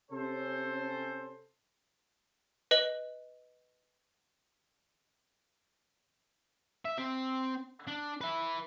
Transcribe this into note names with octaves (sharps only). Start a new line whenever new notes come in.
C3 C#4 A4 C5
B4 D#5 F#7
E5
C4
D4
B4 E5